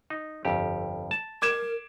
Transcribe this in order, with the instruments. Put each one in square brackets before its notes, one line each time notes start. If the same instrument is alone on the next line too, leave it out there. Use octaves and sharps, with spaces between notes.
[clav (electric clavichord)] D#4
G1 F2 G4
A5
[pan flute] A#4 [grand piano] D6 G#6 E7